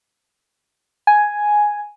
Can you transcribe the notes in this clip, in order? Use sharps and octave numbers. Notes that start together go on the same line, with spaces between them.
G#5